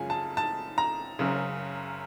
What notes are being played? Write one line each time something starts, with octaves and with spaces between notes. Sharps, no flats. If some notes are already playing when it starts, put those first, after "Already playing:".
Already playing: F#2 C#3 F3 G#3 G#5
A5
A5
A#5
F#1 F#2 C#3